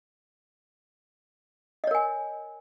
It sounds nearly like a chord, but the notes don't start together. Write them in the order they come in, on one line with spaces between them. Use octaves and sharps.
D#5 C#5 A#4 G#5